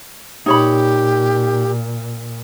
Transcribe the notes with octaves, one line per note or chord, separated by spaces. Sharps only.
A#2 D#4 G4 C#5 B5